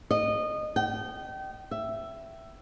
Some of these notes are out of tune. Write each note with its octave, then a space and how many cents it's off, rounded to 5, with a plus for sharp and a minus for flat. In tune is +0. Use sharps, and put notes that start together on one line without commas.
D#5 -20
G5 -30
E5 +10